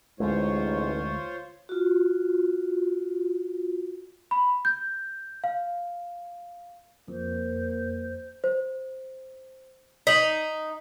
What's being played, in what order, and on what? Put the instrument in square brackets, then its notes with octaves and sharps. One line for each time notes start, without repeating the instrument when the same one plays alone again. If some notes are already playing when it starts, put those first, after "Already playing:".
[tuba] A1 [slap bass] D2 G#3 A3 [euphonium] G#2 [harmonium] F4 C5 C#5
[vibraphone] F4 F#4
[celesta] B5
G6
F5
[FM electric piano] F2 [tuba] A#3 [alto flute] C5
[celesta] C5
[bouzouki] D#4 [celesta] B6 F#7